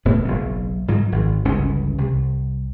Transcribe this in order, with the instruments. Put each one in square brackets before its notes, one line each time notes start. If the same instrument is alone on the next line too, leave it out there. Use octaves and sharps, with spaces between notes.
[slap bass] E1 A2 B3
F#1 B1
G#2 F3 F#3
G#1
G1 C#2 E3 C#4
C2